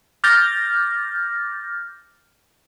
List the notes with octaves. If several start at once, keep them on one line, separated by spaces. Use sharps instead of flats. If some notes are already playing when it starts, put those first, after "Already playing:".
D6 F6 G6 A6 A#6